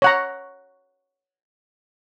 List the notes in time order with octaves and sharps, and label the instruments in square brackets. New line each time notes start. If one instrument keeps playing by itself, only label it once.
[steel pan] C#5 F#5 A#5